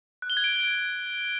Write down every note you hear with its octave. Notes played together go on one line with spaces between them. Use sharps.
F#6
G7
G#6
D7
G7